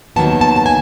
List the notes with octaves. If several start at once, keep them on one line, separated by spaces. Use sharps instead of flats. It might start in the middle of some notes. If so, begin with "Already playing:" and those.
D#2 D#3 F#3 B3 A5
A5
A5
G#5